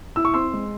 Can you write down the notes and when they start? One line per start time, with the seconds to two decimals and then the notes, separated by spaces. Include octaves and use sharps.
0.16 E4 E6
0.25 C#6
0.34 C4 C6 E6
0.53 G#3